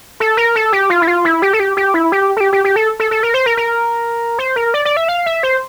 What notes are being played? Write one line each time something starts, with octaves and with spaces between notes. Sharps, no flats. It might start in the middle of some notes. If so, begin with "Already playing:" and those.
A4
A#4
A4
G4
F4
E4
F4
E4
G4
A4
G4
G4
E4
G4
A4
G4
G4
G4
A4
A4
A4
A#4
C5
A#4
A#4
C5
A#4
D5
D5
E5
F5
E5
C5